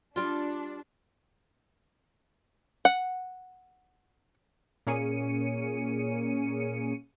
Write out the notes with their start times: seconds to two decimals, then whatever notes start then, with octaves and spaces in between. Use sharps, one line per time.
0.16 G3 D4 F4
2.85 F#5
4.87 A#2 A#3 C#4 G#4 C#7 D#7